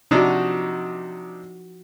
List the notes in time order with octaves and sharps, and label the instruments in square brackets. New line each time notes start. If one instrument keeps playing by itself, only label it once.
[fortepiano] C3 D4 D#4 [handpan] F3 F#4